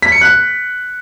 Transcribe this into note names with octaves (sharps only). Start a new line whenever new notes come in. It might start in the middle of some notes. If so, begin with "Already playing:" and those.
B6
C#7
F#6